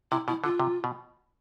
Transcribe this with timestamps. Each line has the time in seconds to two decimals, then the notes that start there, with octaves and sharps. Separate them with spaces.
0.11 C3 E4
0.28 B2 E4
0.44 D3 F4
0.60 C3
0.84 B2